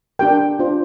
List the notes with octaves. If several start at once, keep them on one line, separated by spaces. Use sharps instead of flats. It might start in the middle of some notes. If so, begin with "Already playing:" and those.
D4 G4 A#4 G5
D4 F4 C5